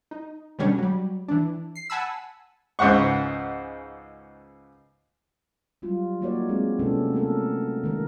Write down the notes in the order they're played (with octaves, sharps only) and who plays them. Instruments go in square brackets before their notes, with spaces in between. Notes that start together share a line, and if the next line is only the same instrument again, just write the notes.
[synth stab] D#4
B2 D3 G3 C#4 D4
F#3 G3
E3 D4
C7
F#5 G#5 A5 B5 E6
[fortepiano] C#2 G#2 C5 F#5 C#6
[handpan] F#3 G3 F4
A#3 D#4 F#4 A#4 C#5 D5
G#3 C4 G#4
C3 G#3 B3 C#4 E4 A4
A3 F#4 A4 A#4
D#3 G#3 A#4